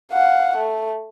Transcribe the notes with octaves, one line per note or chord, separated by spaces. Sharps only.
F5 F#5
A3